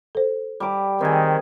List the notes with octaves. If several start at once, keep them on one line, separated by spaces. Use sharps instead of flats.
A4 C5
G3 D6
D#3 C4 G#4